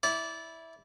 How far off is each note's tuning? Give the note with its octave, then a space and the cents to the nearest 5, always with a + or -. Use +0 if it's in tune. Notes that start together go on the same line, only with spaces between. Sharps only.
E4 -10 D5 -20